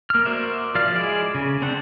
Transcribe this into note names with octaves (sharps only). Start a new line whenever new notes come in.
A#3 F6
F#4 A#4 C5 D5 E5
F3 D5 F5 F6
G#3 E4 G#4 D5
C#3
C4 D4 C5 F#5